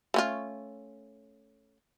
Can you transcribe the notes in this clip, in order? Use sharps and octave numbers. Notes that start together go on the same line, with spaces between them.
A3 C#4 F4